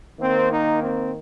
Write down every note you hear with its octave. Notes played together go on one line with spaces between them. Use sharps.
D#3 A#3 C4
D#4
C4